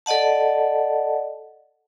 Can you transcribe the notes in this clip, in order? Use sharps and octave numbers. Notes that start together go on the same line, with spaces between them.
A4 D5 D#5 F#5 A5